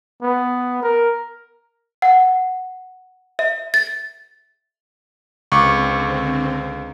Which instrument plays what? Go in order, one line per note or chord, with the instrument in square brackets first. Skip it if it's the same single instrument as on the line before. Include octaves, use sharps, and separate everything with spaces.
[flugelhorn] B3
A#4
[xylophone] F#5
E5
A6
[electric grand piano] C#2 [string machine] D3 C4 [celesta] C#6 D6 C#7